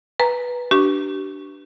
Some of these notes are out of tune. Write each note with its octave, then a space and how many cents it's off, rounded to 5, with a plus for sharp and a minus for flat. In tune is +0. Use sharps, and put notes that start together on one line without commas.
B4 -10 A#5 +0
D4 +0 G4 -40 C#6 +0